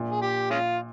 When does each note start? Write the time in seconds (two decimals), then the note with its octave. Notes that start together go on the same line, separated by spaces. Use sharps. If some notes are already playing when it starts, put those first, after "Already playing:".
Already playing: A#1 A#2
0.12 G#4
0.22 G4
0.50 G#3 C#4 F4